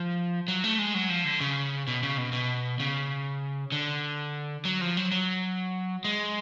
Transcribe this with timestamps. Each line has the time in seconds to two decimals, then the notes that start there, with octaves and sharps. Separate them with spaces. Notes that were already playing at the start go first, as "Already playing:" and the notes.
Already playing: F3
0.48 F#3
0.64 A3
0.78 G#3
0.95 F#3
1.10 F3
1.24 D3
1.40 C#3
1.87 B2
2.03 C#3
2.18 B2
2.33 B2
2.80 C#3
3.72 D3
4.65 F#3
4.81 F3
4.97 F#3
5.12 F#3
6.04 G#3